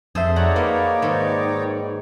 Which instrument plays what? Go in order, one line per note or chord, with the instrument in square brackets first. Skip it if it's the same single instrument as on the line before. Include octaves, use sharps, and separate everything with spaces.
[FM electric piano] F2 E5 [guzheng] G#4 A4 C5
[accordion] D#4 C#5 D5 [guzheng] F#4 F#5
[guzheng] A#3 [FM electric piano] B4 B5
[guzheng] G#2 D#3